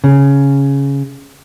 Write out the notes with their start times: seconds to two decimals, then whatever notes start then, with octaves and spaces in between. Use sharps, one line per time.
0.04 C#3